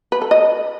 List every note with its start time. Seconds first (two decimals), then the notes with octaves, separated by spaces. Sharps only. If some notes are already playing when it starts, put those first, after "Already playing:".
0.12 B4
0.22 A4
0.31 D#5